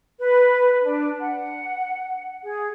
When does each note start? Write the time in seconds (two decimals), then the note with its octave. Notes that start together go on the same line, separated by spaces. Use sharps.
0.19 B4
0.82 D4
1.19 F#5
2.42 G#4